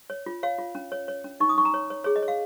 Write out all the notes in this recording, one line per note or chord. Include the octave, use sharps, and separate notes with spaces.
C#5
F4
C#5 F5
F4
C#4
C#5
C#5
C#4
D#4 C#6
D#6
D#4 C#6
A#5
C#5
C#5
G#4 C#5
D#5
C#5
F5